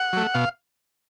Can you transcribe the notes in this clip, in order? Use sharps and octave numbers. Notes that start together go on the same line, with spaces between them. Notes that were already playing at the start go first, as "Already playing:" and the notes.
Already playing: F#5
F#3 A3
B2 F5